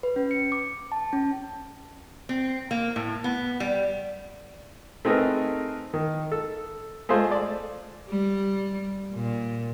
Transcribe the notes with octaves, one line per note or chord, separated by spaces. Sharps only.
B4
C#4
C#7
D6
A5
C#4
C4
A#3
A2
B3
G3
A3 C4 D#4 G#4 A#4 B4
D#3
A4
G#3 A3 F4 G#4 C5
D5
G3
A#2